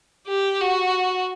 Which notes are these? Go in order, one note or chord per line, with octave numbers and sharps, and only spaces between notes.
G4
F#4